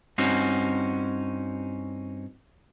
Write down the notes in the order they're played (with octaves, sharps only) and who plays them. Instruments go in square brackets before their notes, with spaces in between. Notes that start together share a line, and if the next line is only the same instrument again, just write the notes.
[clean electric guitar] G2 C4 C#4 D#4 F#4